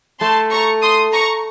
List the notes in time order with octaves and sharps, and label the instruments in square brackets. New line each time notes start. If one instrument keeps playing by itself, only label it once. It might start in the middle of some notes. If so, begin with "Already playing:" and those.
[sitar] A3 [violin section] A5 C6
[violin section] A#5 C#6
C6 D#6
A#5 C#6